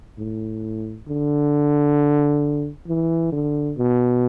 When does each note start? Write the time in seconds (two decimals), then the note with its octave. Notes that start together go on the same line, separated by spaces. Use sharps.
0.19 A2
1.08 D3
2.88 E3
3.32 D3
3.78 B2